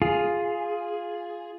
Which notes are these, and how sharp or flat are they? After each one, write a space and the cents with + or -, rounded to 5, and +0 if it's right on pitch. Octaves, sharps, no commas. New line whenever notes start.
F4 +0 G#4 +0